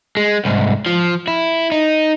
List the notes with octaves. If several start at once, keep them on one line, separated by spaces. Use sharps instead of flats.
G#3
C2 G#2
F3
E4
D#4